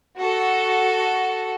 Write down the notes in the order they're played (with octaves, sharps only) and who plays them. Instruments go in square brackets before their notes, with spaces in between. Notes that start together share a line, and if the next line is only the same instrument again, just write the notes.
[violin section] F#4 A4